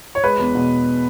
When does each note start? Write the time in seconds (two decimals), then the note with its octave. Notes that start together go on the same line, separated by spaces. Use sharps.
0.15 C#5
0.24 G#3 B4
0.39 E2
0.55 B2